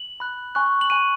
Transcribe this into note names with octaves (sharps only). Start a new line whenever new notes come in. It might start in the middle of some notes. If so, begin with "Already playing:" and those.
Already playing: F#7
B5 F#6
G#5 C#6 F#6
F#7
G#5 C#6 F#6 D#7